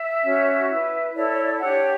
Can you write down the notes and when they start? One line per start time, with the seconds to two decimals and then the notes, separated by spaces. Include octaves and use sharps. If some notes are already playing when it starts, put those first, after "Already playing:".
Already playing: E5
0.24 C#4 F#4 C#5
0.70 E4 B4
1.15 E4 A4 C#5 D5
1.31 C#5
1.45 D5
1.61 D4 G4 C#5 F#5